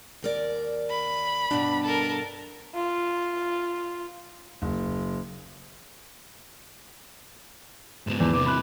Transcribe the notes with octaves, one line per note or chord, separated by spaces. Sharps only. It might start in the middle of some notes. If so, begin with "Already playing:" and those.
D#2 A#4 D5
B5
G2 B2 D4
A4 A#4
F4
F#1
G#2 B3 E7
E2
C3 E3 D6
B5 F#6